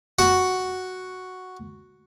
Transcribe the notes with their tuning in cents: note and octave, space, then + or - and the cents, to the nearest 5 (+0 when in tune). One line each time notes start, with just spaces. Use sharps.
F#4 +0 F#5 +0